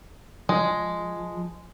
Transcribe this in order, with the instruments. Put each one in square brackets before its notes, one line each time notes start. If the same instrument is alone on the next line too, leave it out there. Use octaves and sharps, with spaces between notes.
[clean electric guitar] F3 [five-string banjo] G#3